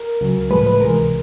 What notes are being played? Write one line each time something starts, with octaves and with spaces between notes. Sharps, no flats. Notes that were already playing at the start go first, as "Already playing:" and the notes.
Already playing: A#4
C#2 C#3 F#3
A2 F3 G#3 B4
B4
C#2 C3 E3 G#3 A#4